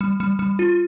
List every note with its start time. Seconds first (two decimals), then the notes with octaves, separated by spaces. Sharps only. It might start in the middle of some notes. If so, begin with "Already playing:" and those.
0.01 G3
0.20 G3
0.39 G3
0.59 F4